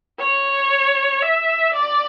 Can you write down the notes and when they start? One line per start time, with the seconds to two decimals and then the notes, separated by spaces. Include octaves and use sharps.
0.19 C#5
1.22 E5
1.74 D5